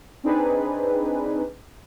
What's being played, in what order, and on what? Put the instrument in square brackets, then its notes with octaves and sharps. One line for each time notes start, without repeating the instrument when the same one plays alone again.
[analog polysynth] C4 D4 D#4 G#4 B4